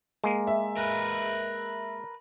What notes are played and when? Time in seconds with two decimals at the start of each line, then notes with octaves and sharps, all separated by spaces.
0.24 G#3 A#3
0.47 E5
0.76 A#4 B4